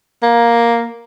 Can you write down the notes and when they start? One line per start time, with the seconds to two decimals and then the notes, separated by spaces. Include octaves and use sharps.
0.23 A#3